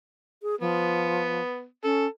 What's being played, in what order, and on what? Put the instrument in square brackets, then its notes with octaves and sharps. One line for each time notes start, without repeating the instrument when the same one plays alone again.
[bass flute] G#4
[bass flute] F3 [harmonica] B3
[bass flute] C#4 [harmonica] A4